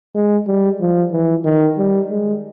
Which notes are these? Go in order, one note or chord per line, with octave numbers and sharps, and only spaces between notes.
G#3
G3
F3
E3
D#3
G3
G#3